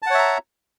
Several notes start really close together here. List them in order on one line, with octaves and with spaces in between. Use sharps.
A5 F#5 C#5 E5 A#5